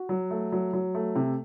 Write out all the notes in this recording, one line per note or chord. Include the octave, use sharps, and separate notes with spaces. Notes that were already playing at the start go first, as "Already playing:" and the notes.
Already playing: F#4
F#3
A3
F#3
F#3
A3
C3